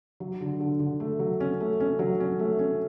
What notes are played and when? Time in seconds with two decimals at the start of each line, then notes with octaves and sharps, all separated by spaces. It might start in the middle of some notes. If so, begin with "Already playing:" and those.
0.20 F#3
0.41 D3
0.60 D3
0.80 D3
1.00 A3
1.19 F#3
1.40 C#4
1.60 A3
1.80 C#4
1.99 F#3
2.20 C#4
2.39 A3
2.59 C#4